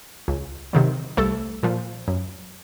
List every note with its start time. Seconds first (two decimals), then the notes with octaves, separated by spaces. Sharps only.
0.28 C#2
0.73 C3 D#3 F#3
1.17 C2 A3 A4
1.63 A#2 F3
2.08 F#2